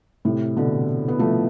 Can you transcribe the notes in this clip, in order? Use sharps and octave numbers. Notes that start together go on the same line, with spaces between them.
A2 C3
B2 D3
B3
F3 A3